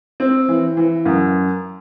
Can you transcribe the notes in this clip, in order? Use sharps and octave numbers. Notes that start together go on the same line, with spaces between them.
C4
E3
E3
F#2